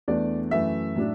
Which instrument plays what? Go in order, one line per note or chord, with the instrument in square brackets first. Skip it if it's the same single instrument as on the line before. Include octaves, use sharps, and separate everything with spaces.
[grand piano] E2 E3 A3 D4 D5
F#2 E3 A3 E5
A2 F#3 D4